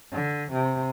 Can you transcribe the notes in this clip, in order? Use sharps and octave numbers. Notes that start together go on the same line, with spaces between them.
D3
C3